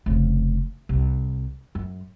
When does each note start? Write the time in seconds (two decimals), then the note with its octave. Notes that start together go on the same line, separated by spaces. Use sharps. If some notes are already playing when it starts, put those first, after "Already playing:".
0.06 F1 C#3
0.89 C2
1.75 F#2